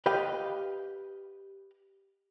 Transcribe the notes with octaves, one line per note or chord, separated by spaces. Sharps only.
G4 B4 D#5 F5 G5